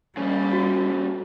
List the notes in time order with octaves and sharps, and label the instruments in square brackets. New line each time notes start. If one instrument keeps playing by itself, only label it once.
[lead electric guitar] A#2 C#3 [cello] G3
[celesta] F#4